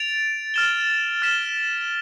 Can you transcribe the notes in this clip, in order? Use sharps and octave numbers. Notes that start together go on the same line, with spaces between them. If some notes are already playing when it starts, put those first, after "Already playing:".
Already playing: A6 D7 F7
F6 A6 E7 G7
F6 B6 E7 G7